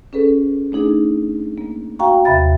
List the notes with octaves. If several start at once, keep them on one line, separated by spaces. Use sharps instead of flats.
C#4 G#4 A4 B4
A3 D4 D#4 G#4
A#3
F#4 F5 G5 A#5 C#6
D#2 C3 E5 B5 A6